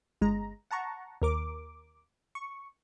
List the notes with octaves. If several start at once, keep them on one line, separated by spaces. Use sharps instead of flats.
G1 G#3 A#5
F#5 A5 A#5 C#6
D#2 A#4 D6
C#6